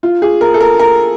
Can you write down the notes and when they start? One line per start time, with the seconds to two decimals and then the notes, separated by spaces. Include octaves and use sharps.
0.03 F4
0.22 G#4
0.41 A#4
0.54 A4
0.61 A#4
0.79 A#4